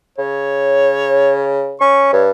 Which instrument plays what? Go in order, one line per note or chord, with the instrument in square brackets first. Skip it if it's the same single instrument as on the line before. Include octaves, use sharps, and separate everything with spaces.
[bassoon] C#3 [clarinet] C#5
[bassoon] C#4 [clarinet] C#6
[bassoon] G2 [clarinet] C#5